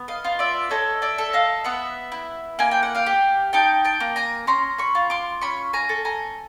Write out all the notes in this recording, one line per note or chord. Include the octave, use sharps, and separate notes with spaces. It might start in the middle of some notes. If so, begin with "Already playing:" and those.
Already playing: B3
D#5 F5
F4
D5 E5
A4 C#5 D#5
D5 E5
A4
D#5 F5
B3 E5 F#5
E4
A#3 G#5
G5
F#5
F5 G5
G4
D#4 G5 A5
G5 A5
A#3
G#5 A#5
C#4 A#5 C6
B5 C#6
F4
C6 D6
C#4 B5 C#6
G#5 A#5
A4
G#5 A#5